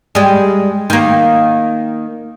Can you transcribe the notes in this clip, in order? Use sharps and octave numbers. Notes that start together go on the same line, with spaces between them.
G3 G#3
D#3 A#3